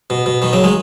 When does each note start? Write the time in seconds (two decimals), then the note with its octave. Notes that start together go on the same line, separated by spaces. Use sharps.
0.10 B2
0.26 B2
0.42 B2 D#3
0.53 C#3 F#3
0.64 D#3 G#3